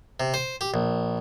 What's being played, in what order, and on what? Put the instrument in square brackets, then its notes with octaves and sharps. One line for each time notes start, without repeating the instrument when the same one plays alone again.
[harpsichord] C3
C5
G4
A#1